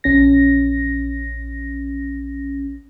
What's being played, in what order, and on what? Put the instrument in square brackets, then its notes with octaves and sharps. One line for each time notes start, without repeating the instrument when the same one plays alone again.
[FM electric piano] A#1 C#4 A#6